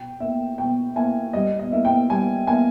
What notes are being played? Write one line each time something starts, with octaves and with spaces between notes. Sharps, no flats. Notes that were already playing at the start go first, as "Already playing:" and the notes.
Already playing: B2 G5
A#3 E4 E5
B2 G5
A#3 E4 G#5
G3 D#5
D#5
A#3 E4
G5
G3 G#5
A#3 E4 G#5